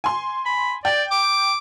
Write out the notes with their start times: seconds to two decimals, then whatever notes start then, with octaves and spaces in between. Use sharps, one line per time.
0.04 G#5 C6
0.46 B5
0.85 D5 G5
1.11 D6